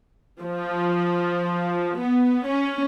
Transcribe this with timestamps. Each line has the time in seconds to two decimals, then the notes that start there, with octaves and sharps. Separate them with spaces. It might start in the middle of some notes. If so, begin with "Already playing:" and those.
0.42 F3
1.99 B3
2.48 C#4